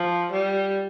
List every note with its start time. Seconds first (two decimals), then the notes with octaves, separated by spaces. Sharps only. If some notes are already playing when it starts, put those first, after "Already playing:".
Already playing: F3
0.32 G3